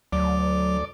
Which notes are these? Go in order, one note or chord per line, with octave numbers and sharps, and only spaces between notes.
D2 F#3 D5